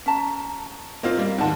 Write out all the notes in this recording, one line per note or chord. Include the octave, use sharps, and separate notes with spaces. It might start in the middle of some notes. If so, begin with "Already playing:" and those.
C#4 A5 A#5
A#3 C4 F4 C5 D#5
G3 A#3
D#2 G#2 F#5 A5